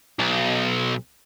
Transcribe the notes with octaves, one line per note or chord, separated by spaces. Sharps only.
B1